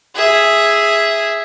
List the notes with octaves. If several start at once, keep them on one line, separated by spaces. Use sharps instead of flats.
G#4 E5